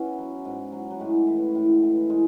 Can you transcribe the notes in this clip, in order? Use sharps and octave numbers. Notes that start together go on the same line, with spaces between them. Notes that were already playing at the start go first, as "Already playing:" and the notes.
Already playing: B3 C#4 E4 F#4
F#3
G#2
F#3
F#3
A2 G#3
E3
A2
E3
A2 G#3